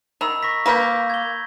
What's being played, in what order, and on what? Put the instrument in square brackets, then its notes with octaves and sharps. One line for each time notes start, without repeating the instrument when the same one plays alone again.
[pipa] D#3 [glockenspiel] A#5 B5 E6
[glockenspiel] C#6 A#6 B6
[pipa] A#3 B4 A#5 [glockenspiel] G6 A#6
[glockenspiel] G#6 G7